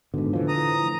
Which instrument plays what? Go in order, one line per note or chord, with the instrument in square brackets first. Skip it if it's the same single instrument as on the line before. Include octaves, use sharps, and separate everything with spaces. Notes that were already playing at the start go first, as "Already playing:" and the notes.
[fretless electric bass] G#2 B2 [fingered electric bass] D3
[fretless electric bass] A2 E3 F3
[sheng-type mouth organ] A#5 D#6